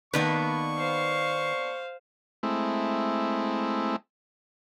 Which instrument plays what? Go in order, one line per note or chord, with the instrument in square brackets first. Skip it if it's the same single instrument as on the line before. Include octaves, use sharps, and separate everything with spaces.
[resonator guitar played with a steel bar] D#3 B4 [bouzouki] A#3 B3 D4 [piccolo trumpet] C#6
[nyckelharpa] C5 F5
[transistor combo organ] G#3 A3 C4 E4